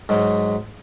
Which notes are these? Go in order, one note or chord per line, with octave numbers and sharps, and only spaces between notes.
G#2 F#3 G#3